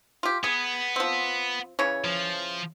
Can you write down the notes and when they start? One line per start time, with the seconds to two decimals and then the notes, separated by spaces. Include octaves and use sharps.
0.23 F4 G4
0.44 B3 G#4
0.96 F3 C4
1.79 C#3 E3 C#5
2.05 F3